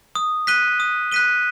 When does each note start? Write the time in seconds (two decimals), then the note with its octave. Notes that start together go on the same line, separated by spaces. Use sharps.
0.15 D#6
0.47 F#6 B6 D#7 G7
0.80 D#6
1.12 F#6 B6 D#7 G7